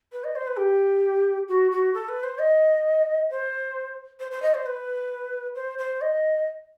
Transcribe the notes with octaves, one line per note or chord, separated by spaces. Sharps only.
B4
D#5
C5
B4
G4
F#4
F#4
A4
B4
C5
D#5
C5
C5
C5
D#5
C5
B4
C5
C5
D#5